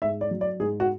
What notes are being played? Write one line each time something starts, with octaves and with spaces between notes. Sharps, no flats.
G#2 E5
D5
F#3
D5
G#2 G#4
F#4